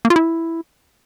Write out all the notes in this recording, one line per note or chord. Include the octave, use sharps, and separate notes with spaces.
A#3
F4
E4